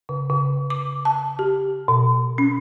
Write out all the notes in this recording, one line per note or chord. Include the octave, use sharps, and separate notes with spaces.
C#3
C#3
D6
A5
G4
B2
C#4